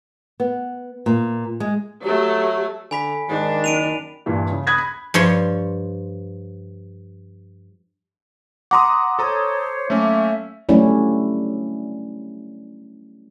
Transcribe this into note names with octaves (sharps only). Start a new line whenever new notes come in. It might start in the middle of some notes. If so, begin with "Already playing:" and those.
B3
A#2
G#3
F#3 A3 G4
D3 G#5 B5 B6
G#2 D#3 D4
F#1 D7 D#7 F7
G2 A#2 E3
C#3
B5 D#6 F#6 G#6 A#6
B5
G2 F3 C#5 C6
F#5 A#5 C6 D6 D#6
A4 C5 C#5 A#5 D#6
F#3 A3 A#3 C#4 E5
F#3 G3 A3 C#4 D4 E4